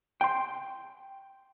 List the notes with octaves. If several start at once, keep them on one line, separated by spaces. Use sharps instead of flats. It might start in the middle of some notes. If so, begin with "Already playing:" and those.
G5 C6